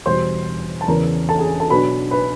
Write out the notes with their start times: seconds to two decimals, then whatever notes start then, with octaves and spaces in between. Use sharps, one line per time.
0.06 E2 B2 G3 C5 C6
0.81 A5
0.88 E2 C#3 E3 A#4 A#5
1.29 A4 A5
1.39 G#4 G#5
1.60 A4 A5
1.70 B2 F#3 B3 D4 B4 B5
2.11 B4 B5